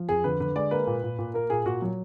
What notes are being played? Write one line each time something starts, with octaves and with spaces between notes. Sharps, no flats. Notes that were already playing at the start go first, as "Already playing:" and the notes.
Already playing: F3
F2 G#4
D3 B4
D3 B4
G#3 D5
A#3 B4
A#2
A#2
A#2
A#3 A#4
A#2 G#4
A#2 F#4
F#3